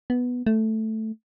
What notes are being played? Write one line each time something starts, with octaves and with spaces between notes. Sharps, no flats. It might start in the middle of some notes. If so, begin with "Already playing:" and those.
B3
A3